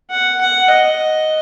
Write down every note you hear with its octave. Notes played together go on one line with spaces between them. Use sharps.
F#5
F#5
D#5